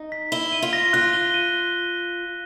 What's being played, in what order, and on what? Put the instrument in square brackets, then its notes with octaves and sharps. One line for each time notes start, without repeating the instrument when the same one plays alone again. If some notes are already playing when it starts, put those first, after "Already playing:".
Already playing: [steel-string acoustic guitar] D#4
[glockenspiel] B6
[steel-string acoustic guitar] E4 [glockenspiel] G7
[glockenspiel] D#7
[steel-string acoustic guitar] F4
[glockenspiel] A#6
[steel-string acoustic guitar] F4 [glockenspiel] F#6
[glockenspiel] G7
D#7